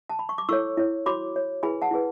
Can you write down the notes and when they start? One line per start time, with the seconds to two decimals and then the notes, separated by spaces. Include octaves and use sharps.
0.10 A5
0.19 B5
0.29 C#6
0.38 D6
0.49 E4 A4 C#5 C#6 E6
0.77 E4 A4 C#5
1.06 F#4 C#5 B5 D6
1.34 F#4 C#5
1.63 E4 G#4 B4 G#5 B5
1.82 F#5 A5
1.91 E4 G#4 B4